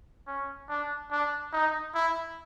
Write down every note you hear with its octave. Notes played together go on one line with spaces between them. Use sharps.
C#4
D4
D4
D#4
E4